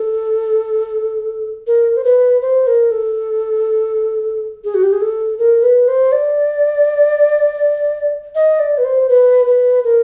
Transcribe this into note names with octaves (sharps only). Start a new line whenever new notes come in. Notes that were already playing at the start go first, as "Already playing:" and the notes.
Already playing: A4
A#4
C5
B4
C5
A#4
A4
G#4
F#4
G4
G#4
A4
A#4
B4
C5
D5
D#5
D5
B4
C5
B4
B4
A#4